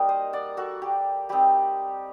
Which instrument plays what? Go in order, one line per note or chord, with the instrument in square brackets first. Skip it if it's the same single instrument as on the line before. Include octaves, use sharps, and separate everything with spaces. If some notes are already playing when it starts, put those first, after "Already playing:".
Already playing: [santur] G3 A#3 D#4 A#4
C5 D#5
D5 F#5
F#4 A4
G4
G3 C4 D#4 G4